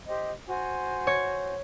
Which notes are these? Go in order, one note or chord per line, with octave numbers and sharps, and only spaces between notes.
G4 C5 D#5
F#4 C5 G#5
C#5